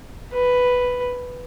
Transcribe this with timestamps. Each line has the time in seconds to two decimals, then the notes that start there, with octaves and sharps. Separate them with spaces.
0.33 B4